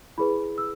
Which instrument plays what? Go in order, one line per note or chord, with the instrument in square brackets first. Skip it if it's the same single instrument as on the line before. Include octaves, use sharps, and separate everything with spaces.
[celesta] E4 G#4 B4 B5
E6